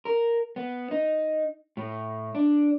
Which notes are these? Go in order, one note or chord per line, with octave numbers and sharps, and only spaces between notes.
A#4
B3
D#4
A2
D4